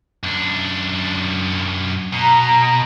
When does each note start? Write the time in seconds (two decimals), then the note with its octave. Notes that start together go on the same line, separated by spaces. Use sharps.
0.24 F#2 D4
2.13 B2 A#5